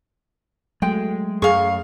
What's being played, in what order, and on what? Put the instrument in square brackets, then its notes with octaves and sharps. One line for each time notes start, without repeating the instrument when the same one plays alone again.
[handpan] F#3 A3 [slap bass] G#3 [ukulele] G5
[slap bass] F#2 [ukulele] G#4 [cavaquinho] F5 C#6